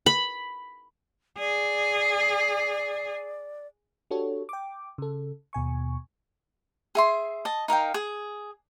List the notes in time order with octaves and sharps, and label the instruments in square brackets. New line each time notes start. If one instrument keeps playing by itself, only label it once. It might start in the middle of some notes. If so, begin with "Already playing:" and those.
[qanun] B5
[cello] G#4 [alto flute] D5
[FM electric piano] D4 F#4 G4 A4 C#5
G5 D6
C#3 A4
D#2 B2 G#5 C#6
[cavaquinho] G#4 E5 C6
D#5 A5
D#4 A#4 F5 G5
G#4